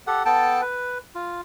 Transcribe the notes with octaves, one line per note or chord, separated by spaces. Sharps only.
G4 A4 F#5
B3 A4 G5 A5
B4
F4